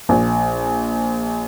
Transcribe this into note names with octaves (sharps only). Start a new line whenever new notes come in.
A#1